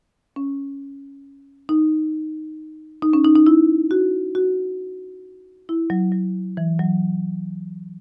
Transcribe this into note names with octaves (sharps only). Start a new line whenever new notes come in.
C#4
D#4
D#4
C#4
D#4
D#4
E4
F#4
F#4
E4
F#3
F#3
E3
F#3